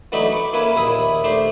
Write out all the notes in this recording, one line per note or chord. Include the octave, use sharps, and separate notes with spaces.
E3 F#3 A3 D4 D#4 B5
C#6 D6
A#3 C#4 E4 B4 G#5
A#1 D#2 E4 E5 D#6
A3 D4 G4 C5